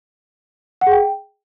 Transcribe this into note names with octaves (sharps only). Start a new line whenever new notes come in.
F#5
G#4
G5